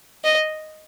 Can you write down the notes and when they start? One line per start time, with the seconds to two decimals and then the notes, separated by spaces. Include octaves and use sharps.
0.24 D#5